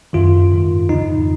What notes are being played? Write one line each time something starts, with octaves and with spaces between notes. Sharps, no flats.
F#2 D#3 F4
G#2 D#3
F2 C#3 D#4